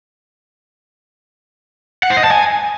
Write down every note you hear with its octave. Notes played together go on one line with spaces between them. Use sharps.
F#5
C5
D#5
A5
G#5